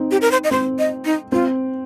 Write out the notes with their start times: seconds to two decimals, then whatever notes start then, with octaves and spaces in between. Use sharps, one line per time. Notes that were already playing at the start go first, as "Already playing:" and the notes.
Already playing: C4 D#4
0.11 G4
0.22 A#4
0.32 C5
0.44 D#5
0.51 C4 C5
0.79 D#5
1.05 D#4
1.32 C4 F4